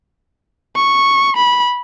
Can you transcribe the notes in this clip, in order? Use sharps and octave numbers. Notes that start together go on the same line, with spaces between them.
C#6
B5